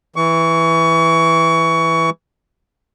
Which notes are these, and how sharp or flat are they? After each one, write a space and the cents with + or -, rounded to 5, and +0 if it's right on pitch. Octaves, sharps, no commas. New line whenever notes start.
E3 +0 C#6 +25